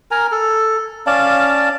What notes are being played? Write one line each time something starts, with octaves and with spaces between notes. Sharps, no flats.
A#4 G#5 A#5
A4
C#4 D5 F5 A5